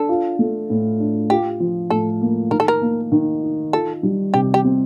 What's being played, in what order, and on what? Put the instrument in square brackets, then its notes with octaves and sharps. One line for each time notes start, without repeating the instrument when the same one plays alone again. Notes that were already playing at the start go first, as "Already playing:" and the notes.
Already playing: [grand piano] D4 [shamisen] A4
[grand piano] F4
A3
A2
D4
[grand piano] F4 [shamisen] G4
[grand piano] F3
[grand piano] A2 [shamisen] A4
[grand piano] A#3
[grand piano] D#3 [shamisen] A#4
[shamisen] A4
A#4
[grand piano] A#3
D#3
D#4
[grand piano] F4 [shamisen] A4
[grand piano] G3
[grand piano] C3 [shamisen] G4
[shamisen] G4
[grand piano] C4